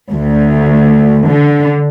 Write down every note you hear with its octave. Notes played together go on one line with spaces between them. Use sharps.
D2
D3